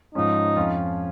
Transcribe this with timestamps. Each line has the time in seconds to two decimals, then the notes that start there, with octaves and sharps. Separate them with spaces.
0.15 G#2 F3 G#3 C#4 D#4
0.56 F2 F3 C#4 F4